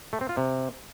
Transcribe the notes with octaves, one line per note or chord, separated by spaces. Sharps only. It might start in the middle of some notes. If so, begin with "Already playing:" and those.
A3
C4
F4
C3